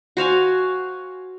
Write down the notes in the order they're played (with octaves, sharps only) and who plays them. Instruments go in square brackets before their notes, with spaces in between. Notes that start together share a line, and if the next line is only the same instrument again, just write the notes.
[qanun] F#4 C5 F5 G#5